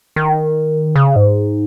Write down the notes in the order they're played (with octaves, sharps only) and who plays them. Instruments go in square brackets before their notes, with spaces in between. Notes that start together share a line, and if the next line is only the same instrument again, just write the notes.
[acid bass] D#3
C#3
G#2